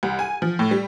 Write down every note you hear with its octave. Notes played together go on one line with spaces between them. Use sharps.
C2
G#5
F3
A2
G3